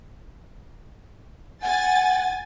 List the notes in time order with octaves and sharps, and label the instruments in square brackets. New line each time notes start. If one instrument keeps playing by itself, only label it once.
[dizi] F#5 [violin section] G#5 A6